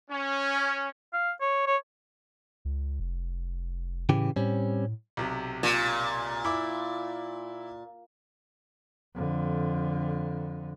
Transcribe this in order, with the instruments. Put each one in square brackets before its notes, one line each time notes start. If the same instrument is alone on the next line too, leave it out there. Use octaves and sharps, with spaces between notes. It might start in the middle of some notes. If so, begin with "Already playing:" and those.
[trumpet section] C#4
[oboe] F5
C#5
C#5
[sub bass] C#2
F1
[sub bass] A2 [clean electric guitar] C#3 E3 G4
[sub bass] A2 [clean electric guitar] G3 C4 C#4
[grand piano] B1 C3
[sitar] A#2
[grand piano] E4 D6
[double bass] F2 D3